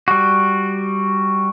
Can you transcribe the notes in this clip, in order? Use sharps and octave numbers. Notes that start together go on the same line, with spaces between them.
G3 F#4